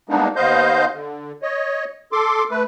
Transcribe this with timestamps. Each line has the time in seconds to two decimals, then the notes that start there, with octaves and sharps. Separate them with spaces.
0.09 G3 G#3 A#3 B3 D4 D#4
0.36 D#2 B3 C5 D#5 F5 G6
0.93 D3
1.42 C#5 D#5
2.12 A4 C6 D6
2.51 A3 B4